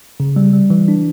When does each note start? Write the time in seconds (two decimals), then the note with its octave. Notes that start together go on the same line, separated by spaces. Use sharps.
0.20 C#3
0.36 G3
0.53 G3
0.70 E3
0.88 D4